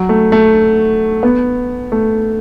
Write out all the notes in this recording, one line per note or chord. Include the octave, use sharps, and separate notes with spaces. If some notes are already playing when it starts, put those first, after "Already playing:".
Already playing: F#3
A3
A3
B3
A3